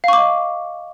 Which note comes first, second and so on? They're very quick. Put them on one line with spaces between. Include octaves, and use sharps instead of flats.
F5 C#6 D6 D#5